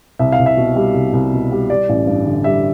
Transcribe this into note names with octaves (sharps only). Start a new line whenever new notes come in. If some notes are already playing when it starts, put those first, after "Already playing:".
C2 E5
F5
C2
E5
B2
G3
C2
C2
B2
G3
G3 D5
A1
G2
D3
G3 E5